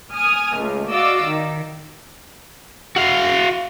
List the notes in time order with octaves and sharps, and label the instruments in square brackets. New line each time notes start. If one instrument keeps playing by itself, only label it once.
[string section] G#5 D#6 F6
C#2 A3
F#4 D5 D#5 F5 D6 E6
D#3
[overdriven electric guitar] F#4 F5